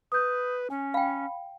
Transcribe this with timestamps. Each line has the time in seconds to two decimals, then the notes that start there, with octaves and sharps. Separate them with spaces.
0.12 B4 D#6 G6
0.70 C#4 G#5
0.94 F5 G5 B5